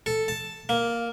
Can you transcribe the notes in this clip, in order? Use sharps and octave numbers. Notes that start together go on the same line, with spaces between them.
A4
A5
A#3